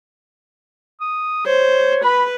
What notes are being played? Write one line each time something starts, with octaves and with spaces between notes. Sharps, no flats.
D#6
C5 C#5
B4 B5